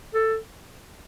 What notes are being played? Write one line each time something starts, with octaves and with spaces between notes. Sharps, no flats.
A4